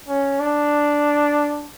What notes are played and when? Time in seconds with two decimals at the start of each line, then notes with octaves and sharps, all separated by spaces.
0.09 C#4
0.40 D4